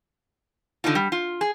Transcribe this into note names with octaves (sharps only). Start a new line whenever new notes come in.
D3 C4 D4 D#4 F4
G3
F4
G#4